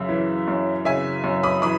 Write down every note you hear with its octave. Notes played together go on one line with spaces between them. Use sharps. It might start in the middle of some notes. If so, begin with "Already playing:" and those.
Already playing: F#2 C#3 E5
E3
F#2
C#3 E5 G#5
F#2
B5 D#6
E3 B5 D#6